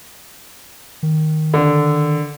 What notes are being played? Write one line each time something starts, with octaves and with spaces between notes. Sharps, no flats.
D#3
D3